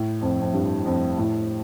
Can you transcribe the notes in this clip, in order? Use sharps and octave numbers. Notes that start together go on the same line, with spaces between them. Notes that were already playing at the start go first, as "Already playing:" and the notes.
Already playing: A2
F2
F2
G2
F2
A2